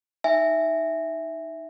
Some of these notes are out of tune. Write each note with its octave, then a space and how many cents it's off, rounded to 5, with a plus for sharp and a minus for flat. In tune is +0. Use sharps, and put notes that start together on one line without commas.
D#4 +0 E5 +0 G#5 -25